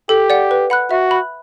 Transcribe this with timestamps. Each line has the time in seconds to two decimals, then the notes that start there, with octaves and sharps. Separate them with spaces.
0.09 G4 A4
0.30 D5 F#5
0.51 B4
0.70 F#5 B5 F#6
0.91 F#4 E5
1.11 B5 F#6